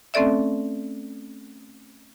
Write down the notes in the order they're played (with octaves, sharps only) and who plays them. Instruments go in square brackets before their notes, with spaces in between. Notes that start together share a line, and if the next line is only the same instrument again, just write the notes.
[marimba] A3 C4 C#4 A4 D5 E5